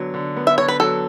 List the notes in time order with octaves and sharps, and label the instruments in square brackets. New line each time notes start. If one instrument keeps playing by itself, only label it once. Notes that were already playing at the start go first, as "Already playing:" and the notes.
Already playing: [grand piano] D3 F#3 B3
D3
B3
[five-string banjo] E5
[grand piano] D3 [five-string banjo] C#5
[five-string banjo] B4
[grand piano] F#3 [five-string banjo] A4